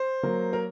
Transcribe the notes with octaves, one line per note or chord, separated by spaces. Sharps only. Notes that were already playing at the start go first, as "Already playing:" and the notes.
Already playing: C5
F#3 A#3
A#4